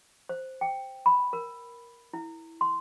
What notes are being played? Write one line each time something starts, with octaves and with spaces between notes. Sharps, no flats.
C5
G5
B5
A#4
E4
C6